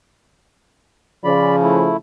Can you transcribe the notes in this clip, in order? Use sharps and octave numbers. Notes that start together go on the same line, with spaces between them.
C#3 F3 D5 B5
A3 E4